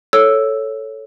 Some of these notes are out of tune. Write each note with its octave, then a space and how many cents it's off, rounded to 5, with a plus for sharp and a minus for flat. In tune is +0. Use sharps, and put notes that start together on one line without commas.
A4 +0 C#5 +0 E6 +0